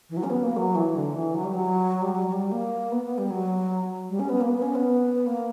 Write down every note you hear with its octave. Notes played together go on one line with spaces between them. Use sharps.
E3
F#3
C#4
B3
A#3
F#3
E3
D3
E3
F#3
G3
F#3
G3
F#3
F#3
G3
A#3
B3
B3
G3
F#3
G3
C#4
B3
A#3
B3
C#4
B3
A#3